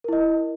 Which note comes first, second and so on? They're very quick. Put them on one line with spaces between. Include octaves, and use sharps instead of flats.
A#4 E4 D#5